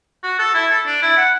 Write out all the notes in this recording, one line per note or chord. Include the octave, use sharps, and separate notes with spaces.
F#4
A4
E4
A4
D4
E4
F#5